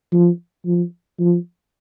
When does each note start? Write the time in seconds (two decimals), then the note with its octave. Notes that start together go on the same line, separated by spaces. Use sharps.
0.12 F3
0.66 F3
1.20 F3